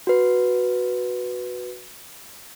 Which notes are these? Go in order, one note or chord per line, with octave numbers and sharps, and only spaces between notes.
F#4 B4